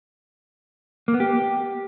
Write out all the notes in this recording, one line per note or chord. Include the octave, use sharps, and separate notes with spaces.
A#3
B3
G4